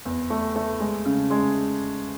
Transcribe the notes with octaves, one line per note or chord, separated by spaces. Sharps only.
E2
A3
A3
G#3
C#3
G#3